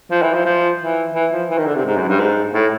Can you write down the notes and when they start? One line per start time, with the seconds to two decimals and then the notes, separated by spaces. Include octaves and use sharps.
0.11 F3
0.22 E3
0.34 F3
0.45 F3
0.80 E3
1.14 E3
1.32 F3
1.50 E3
1.58 D#3
1.67 D3
1.75 C3
1.85 G#2
1.96 F#2
2.08 G2
2.19 G#2
2.54 A2